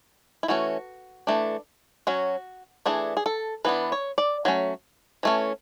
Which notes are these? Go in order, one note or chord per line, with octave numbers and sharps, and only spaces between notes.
E4
E3 A3 C#4 F#4
E3 A3 D4
F#3 C#4 F#4
E3 A3 D4 G#4
G#4
A4
E3 B3 D4 B4
C#5
D5
F#3 A3 C#4
E3 A3 C#4